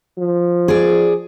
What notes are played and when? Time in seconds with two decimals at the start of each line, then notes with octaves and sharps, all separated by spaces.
0.19 F3
0.68 G#4 D5